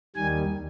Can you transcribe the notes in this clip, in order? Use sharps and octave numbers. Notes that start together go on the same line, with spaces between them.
D#2 D#3 G3 G#5